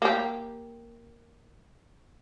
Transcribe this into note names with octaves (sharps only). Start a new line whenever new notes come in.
A#3 G4